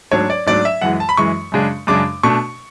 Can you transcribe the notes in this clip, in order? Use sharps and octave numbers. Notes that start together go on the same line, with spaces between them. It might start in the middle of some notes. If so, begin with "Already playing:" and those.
G#2 F#3 A3 D4 C#5
D5
G#2 F#3 A3 D4 D5
E5
F#2 E3 G#3 F#5
A5
B5
F#2 E3 G#3 C#6
F#2 C#3 G#3 D4
F#2 C#3 G#3 D4 D6
B2 A3 D4 C#6